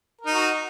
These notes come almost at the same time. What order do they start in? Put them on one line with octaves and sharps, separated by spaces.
A#4 D#4 F#4